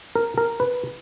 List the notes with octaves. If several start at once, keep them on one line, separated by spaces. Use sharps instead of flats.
A#4
A#4
B4